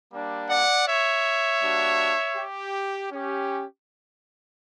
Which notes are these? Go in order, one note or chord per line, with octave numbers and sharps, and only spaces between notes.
G3 A#3 D4
D5 F#5
C#5 E5
G3 A#3 D4 F#4
G4
C#4 G4